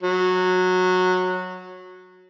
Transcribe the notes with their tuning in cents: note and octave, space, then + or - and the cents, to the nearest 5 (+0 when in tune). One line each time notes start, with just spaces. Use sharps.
F#3 -15